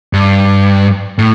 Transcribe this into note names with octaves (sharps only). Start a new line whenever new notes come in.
G2
A2